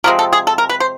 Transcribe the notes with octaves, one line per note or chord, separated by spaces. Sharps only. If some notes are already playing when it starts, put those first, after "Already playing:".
C3 F3 G#3 C4 A#4
A4
G#4
A4
A#4
B4
C5